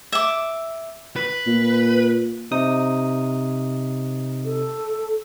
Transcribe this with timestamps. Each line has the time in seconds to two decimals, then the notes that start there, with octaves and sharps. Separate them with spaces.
0.12 E5 D6
1.16 B4
1.47 A#2
2.51 C3 D#4 D#6
4.45 A4